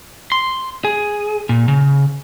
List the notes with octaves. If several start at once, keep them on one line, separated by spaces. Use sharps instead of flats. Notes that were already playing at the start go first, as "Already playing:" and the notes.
C6
G#4
A#2
C#3